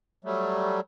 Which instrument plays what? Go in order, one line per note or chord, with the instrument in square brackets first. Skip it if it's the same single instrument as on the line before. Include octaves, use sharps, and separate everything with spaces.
[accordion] F#3 G3 A3